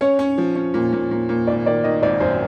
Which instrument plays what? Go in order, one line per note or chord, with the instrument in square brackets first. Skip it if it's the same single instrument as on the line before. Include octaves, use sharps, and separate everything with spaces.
[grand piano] C#4 [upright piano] C#5
[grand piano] C#4
F3
C#4
A#2
A#2
A#2
A#2
[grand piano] G#1 [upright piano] D5
[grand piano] D#3 [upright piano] D5
[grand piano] D#3 [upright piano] D#5
[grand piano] G#1 [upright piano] D5
[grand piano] F#2 [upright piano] C5